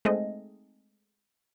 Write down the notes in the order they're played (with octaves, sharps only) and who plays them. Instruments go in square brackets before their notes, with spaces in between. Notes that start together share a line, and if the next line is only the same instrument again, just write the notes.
[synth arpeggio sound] G#3 A3 C4 D#4 D#5